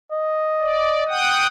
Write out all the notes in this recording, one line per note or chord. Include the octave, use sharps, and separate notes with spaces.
D#5
D5
F#5 G5 D#6